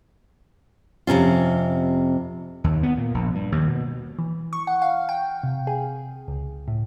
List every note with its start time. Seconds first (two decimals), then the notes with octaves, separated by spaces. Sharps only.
1.07 F2 C3 C#4 F4
2.64 D#2
2.83 B3
2.98 A#2
3.14 A#1
3.35 G2
3.52 D#2
3.67 B2
4.19 E3
4.53 C#6
4.67 F#5
4.82 F5
5.09 G5
5.43 C3
5.67 G#4
6.28 C#2
6.68 A2